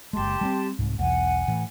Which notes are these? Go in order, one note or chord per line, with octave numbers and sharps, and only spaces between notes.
F#1 G#3 G4 A5 C6
G3 A#3 C4
C2 G#2
B1 E2 F#5 G#5
A2 E3